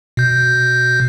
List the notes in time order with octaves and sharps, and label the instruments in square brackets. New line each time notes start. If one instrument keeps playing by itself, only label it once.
[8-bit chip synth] B2 G6